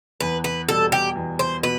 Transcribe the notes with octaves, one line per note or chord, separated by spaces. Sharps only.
E2 B4
B4
B2 G3 A4
G4
E2
C5
B2 B4